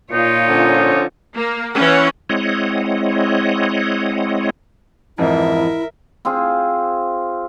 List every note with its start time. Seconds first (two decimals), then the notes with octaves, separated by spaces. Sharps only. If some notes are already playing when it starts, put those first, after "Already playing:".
0.12 A#2 D#4 F4 C#5
0.49 D3 F3 C#4
1.37 A#3
1.74 E3 C#4 F#5
2.30 G#3 C4 E4 C#5 D#5 F#5
5.18 F2 G#2 E3 E4 A#4 E5
6.25 C4 F4 G#4